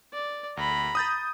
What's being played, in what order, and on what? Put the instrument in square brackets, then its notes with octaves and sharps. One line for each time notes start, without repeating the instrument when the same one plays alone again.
[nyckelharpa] D5
[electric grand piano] D2 [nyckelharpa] A#5 B5
[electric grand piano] D#6 G6 A6